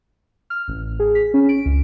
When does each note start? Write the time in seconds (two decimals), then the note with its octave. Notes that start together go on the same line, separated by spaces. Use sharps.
0.50 F6
0.68 A1
1.00 G#4
1.15 B6
1.34 C#4
1.49 D7
1.66 C#2